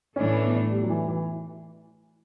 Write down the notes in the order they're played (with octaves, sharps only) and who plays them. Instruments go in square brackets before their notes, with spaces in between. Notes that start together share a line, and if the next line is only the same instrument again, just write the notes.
[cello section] A2 E3 A3 D4 [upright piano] C#4
[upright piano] B3
G3
F#3
E3
E3